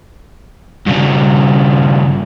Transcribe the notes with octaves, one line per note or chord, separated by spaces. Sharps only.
G2 C#3